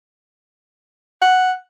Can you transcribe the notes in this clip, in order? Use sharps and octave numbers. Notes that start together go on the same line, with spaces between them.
F#5